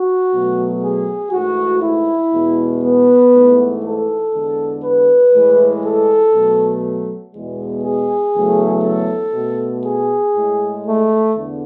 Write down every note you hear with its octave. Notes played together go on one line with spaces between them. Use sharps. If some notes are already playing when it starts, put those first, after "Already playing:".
Already playing: F#4
B2 F#3 A3
G#4
G#2 E3 A3 F#4
E4
E2 B2 G#3
B3
G#2 E3 A3
A4
E2 D3 G#3
B4
A2 E3 G#3
A4
B2 F#3 A3
E2 B2 G#3
G#4
E2 C#3 F#3 A3
A4
B2 A3
G#4
A2 G#3
A3
E2 D3